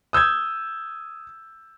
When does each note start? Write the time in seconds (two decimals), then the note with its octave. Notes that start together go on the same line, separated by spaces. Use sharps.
0.13 D#6 E6 G6 G#6